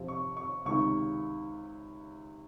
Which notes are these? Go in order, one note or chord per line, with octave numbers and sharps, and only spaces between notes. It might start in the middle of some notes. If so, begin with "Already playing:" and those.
Already playing: F2 C3 F3
C#6
C#6
C#2 C3 D#3 G#3 C#6